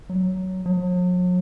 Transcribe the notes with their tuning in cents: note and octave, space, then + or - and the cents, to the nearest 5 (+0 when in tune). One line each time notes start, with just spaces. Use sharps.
F#3 +10
F#3 -45